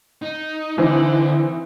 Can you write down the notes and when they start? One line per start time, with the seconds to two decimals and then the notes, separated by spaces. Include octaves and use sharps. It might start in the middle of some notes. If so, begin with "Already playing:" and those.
0.22 D#4
0.78 D3 E3 C4 D#4